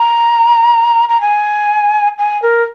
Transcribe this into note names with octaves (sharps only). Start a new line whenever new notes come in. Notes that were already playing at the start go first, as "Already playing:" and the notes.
Already playing: A#5
A#5
G#5
G#5
A#4